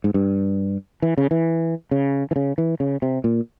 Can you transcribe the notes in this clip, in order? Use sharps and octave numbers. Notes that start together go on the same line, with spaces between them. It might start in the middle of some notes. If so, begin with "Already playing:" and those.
G#2
G2
E3
C#3
E3
C#3
E3
C#3
E3
C#3
C3
A#2